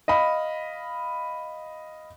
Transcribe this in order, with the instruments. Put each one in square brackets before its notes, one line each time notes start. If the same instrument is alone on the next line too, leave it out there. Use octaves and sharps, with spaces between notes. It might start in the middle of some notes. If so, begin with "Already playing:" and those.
[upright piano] D#5 F5 B5